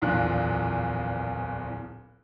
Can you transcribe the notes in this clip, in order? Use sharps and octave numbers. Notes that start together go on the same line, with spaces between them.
D1 A#1 E2 A#2 F4 F#6